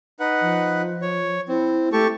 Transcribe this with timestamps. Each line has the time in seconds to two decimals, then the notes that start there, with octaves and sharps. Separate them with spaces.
0.20 D#4 B4 F#5
0.41 F3
1.02 C#5
1.49 C4 E4
1.92 A3 G4 A4 C#6